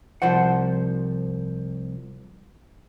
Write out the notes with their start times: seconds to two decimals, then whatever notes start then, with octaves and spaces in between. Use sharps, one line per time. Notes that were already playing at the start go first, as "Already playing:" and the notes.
0.22 C2 F3 C5 F#5